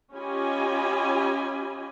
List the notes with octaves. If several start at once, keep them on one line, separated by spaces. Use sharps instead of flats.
C#4 F4 G4 D#5 G#5 B5